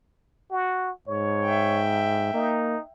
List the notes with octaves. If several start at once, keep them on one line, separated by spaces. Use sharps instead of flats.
F#4
G#2 C#5
E5 G5
A#3 D#4